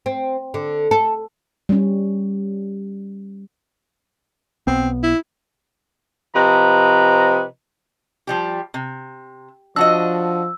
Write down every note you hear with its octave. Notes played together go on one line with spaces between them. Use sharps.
C4
D3
A4
G3 C#4
B1 B3 C4
E4
C3 F3 B4 D#5 A#5
F3 G3 G4
C3
F3 D4 F#4 D#5 E6